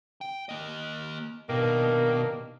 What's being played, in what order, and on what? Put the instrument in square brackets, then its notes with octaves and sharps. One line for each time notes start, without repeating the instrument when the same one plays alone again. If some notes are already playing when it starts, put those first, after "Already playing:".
[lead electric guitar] G5
A#3 D#5
[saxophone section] G2 D#3 A#3 [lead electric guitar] B2